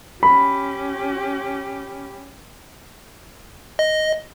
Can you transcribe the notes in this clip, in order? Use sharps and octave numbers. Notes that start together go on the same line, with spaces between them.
C#4 G4 B5
D#5